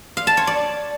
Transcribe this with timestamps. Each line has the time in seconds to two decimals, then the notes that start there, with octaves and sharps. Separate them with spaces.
0.17 F5
0.27 A5
0.37 C#5
0.47 D5